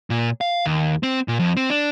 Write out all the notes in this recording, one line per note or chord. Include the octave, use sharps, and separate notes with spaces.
A#2
F5
D#2
C4
A#2
F2
C4
D4